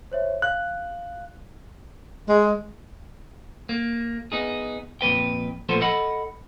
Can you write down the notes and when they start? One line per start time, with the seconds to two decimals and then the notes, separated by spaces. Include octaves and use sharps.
0.11 C5 C#5 E5
0.42 F5 F#6
2.28 G#3
3.69 A#3
4.32 B3 D#4 G#4
5.01 F2 A#2 B4 G5
5.69 A#2 F3 A3 B3 A4 C5
5.81 A4 D#5 F#5 B5